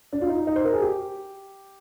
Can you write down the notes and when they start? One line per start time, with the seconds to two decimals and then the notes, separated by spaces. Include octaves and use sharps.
0.13 D4
0.21 F4
0.29 D#4
0.47 D#4
0.56 C5
0.64 A#4
0.73 G#4
0.82 G4